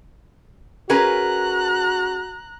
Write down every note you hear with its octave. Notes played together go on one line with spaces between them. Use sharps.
C#4 F#4 G#4 A#4 B4 A#5 F#6